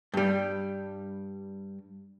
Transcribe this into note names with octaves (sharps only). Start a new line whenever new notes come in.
G2 G3